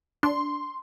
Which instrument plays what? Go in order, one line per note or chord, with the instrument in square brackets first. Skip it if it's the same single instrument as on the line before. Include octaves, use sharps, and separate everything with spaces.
[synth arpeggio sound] D4 [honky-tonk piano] C6